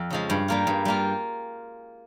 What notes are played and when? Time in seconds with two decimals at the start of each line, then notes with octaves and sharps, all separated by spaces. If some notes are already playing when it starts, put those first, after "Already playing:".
Already playing: F2
0.11 C#3 F3 G#3
0.30 G2
0.48 G3 A#3 F4
0.67 G2
0.85 G3 A#3 F4